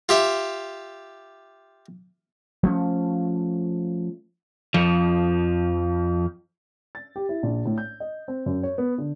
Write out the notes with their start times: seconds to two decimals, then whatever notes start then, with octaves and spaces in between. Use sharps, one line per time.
0.09 F4 G4 E5
2.63 F3 A3 C#4
4.74 F2 F3
6.95 A6
7.16 G4
7.29 E4
7.43 A#1
7.66 A2
7.78 G6
8.00 D#5
8.28 C4
8.46 F#2
8.63 C#5
8.78 B3
8.98 D3